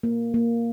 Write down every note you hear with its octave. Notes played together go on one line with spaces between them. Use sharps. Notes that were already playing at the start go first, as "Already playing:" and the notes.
A#3
A#3